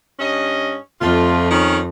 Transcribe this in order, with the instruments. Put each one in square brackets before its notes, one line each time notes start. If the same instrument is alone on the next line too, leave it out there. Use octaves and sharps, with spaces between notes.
[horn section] G2 C#4 D#5
[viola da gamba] F2 [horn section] A3 F4
[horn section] D#3 C#4